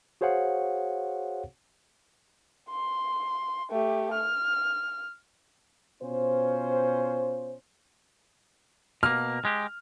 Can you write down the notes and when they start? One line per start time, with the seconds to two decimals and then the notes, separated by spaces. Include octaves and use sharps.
0.21 F#4 G#4 C5 C#5 F5 F#5
2.70 C6
3.71 A3 G4
4.14 F6
6.03 B2 C#4 F4 C5
9.03 B2 A#3 F6
9.45 G#3 G4